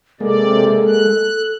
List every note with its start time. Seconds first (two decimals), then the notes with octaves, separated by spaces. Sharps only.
0.20 C3 G#3 A#3 A4 D5
0.87 F#6